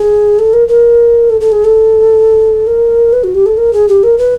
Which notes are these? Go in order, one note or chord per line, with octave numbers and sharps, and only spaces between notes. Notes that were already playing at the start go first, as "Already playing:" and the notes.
Already playing: G#4
A4
A#4
A#4
A4
A4
G#4
A4
A#4
B4
F#4
G4
A4
A#4
G#4
G4
A#4
B4